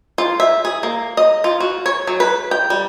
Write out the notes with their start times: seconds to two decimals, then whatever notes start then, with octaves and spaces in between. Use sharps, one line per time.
0.18 F4
0.40 E5
0.65 G#4
0.83 A#3
1.17 D#5
1.44 F4
1.60 F#4
1.86 C#5
2.07 F#3
2.20 B4
2.51 G5
2.70 G3